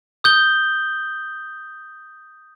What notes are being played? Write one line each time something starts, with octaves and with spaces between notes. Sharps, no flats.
D#6 G6 G7